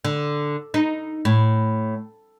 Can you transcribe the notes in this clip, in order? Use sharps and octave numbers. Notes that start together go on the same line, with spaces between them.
D3
D#4
A2